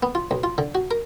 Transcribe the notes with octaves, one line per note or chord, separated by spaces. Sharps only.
B3
F4
B1
F4
D3
F#4
A#4